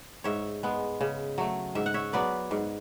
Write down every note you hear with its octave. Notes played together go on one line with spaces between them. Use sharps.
G#2 C#5 E5
G#3 B3
C#3
F#3 A3
G#2 E5
F#5
C#5 E5
F#3 B3 B4 D5
G#2